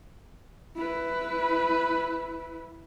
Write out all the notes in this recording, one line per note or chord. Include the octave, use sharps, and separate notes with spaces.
E4 B4